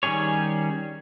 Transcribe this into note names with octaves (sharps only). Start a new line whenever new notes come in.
D#3 G3 C#4 G#4 C#5